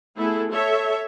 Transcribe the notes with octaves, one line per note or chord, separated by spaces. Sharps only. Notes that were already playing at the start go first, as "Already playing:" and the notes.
A3 B3 E4 G#4 A4
A4 C#5 E5